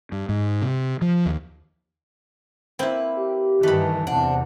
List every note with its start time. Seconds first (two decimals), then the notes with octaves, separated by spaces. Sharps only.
0.12 G2
0.29 G#2
0.62 C3
1.01 F3
1.26 D#2
2.79 A#3 C4 E4 B4
3.16 G4
3.63 G2 D#3 E3 A3 B4 B5
4.07 E2 C3 D4 F#5